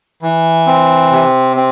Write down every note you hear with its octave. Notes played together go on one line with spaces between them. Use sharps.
E3
C4
C3
C4